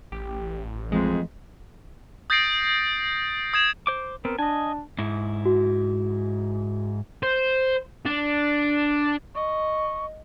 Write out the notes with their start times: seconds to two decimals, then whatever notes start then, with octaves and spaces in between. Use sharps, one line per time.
0.12 A1 G4
0.92 F2 E3 F3 G#3 A3
2.30 D#6 G6 A6 A#6 C7 D7
3.54 D#6 G#6 E7
3.87 C5 D6
4.25 B3 C4 A#4
4.39 D4 D#5 G#5
4.98 G#2 E4
5.45 F#4
7.23 C5
8.06 D4
9.35 D#5 C#6